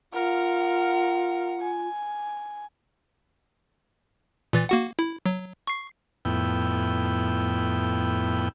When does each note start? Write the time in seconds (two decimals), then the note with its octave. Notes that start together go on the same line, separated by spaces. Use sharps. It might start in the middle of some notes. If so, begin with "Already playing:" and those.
0.13 F4 A#4 F5 F#5
1.60 G#5
4.53 A#2 E3 A6
4.69 A#3 F#4 F#5
4.99 E4
5.26 F#3
5.67 C#6 C7
6.25 F2 A2 B3 E4 G5